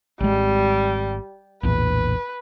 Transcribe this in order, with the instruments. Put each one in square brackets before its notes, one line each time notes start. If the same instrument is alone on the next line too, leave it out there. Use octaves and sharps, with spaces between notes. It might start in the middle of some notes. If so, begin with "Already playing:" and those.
[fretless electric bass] G#1 G#3 [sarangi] G3
[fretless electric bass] A#1 E2 A2 [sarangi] B4